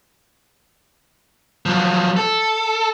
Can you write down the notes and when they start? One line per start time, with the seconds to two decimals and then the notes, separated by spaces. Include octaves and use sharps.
1.66 F3 F#3
2.17 A4